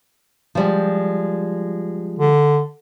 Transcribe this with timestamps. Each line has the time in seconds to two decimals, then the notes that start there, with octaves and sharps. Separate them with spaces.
0.55 F3 G3 G#3
2.19 D3